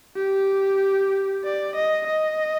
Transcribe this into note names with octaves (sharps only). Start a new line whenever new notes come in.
G4
D5
D#5
D#5